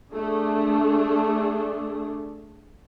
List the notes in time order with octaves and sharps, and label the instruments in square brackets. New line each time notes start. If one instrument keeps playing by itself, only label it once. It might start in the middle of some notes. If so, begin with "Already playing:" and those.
[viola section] A3 D4 G#4